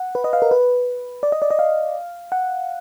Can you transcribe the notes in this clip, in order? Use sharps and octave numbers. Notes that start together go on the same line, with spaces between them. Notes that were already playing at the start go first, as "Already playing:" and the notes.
Already playing: F#5
B4
D#5
F5
A#4
B4
D5
D#5
D5
D#5
F5
F#5